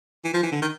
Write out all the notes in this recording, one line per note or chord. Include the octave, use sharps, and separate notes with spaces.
E3
F3
E3
D3
D#3